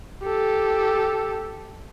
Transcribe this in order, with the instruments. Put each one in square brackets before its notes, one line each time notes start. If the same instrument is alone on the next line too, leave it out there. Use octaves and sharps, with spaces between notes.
[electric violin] G4 A4